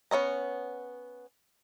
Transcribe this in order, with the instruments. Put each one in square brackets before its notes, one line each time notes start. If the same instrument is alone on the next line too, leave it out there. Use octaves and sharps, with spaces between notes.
[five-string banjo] B3 C#4 D#5 A#5